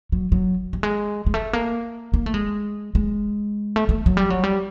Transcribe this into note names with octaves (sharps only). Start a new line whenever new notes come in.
F#3
F#3
G3
G#3
G#3
A3
A#3
A#3
A3
G#3
G#3
A3
A3
F#3
G3
F#3
G3